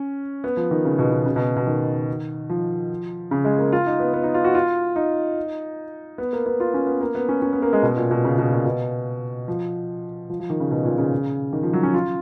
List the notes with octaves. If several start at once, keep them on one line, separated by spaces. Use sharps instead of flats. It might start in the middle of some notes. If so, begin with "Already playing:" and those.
Already playing: C#4
B3
F3
D#3
C#3
B2
C#3
C#3
B2
B2
D#3
F3
C#3
G#3
A#3
F4
D#4
B3
B3
D#4
F4
F#4
F4
D#4
B3
A#3
B3
F4
C#4
B3
A#3
B3
C#4
C#4
B3
A#3
G#3
B2
A#2
B2
C#3
B2
A#2
B2
F3
F3
F3
D#3
C#3
B2
A#2
C#3
D#3
F3
F#3
C#4
F4